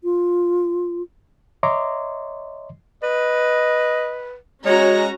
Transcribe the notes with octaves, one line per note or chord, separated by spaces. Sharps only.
F4
C#5 D#5 E5 A#5 C6 D6
B4 D#5
G#3 C#4 F#4 C#5 A#5